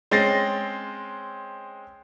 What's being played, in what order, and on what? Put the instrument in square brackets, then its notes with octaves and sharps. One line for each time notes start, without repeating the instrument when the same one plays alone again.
[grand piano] G#3 C4 C#4 A6 A#6 C7